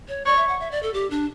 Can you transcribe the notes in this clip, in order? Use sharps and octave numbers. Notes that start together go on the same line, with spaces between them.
C#5
C#5 D5
E5
F#5
E5
D5
A4
G4
D4